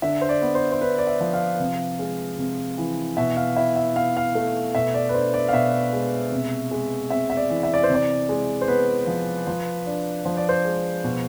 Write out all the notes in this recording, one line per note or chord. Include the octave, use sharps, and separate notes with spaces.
D3 E5
C5
D5
B3
C5
C5
D3 B4
D5
E5
F3
F5
C3
G#3
C3
E3
B2 E5
F5
E4 E5
E5
B2 F5
F5
A3
B2 E5
D5
B4
D4 C5
D5
F5
B2 E5
G#3
C3
G#3
C4 E5
E5
D5
E3
E5
D5
C5
C3 D5
G#3
C5
B3 B4
F3
F3
D4
F3 C5
D5
C5
G#3
B2